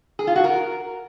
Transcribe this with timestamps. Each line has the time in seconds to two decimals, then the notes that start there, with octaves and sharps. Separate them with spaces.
0.19 G#4
0.27 F4
0.36 F#4
0.44 A#4